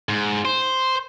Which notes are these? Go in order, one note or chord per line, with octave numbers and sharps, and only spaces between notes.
G#2
C5